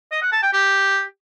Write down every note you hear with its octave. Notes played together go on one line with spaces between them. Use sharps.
D#5
F#5
A5
G5
G4